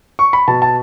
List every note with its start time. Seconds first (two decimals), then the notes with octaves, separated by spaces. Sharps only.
0.19 C#6
0.33 B5
0.48 B2 A5
0.62 A5